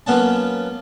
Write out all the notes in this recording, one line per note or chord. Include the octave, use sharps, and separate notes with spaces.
F#3 A#3 B3 C#4 A5